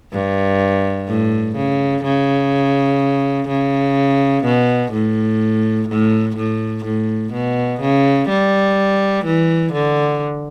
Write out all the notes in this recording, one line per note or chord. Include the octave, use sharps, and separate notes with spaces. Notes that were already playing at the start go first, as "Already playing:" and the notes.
G2
A2
C#3
C#3
C#3
B2
A2
A2
A2
A2
B2
C#3
G3
E3
D3